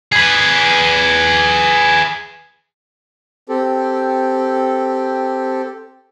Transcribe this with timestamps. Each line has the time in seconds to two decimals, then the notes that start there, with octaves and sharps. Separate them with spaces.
0.12 G#4 B4
3.49 C4 G4 A4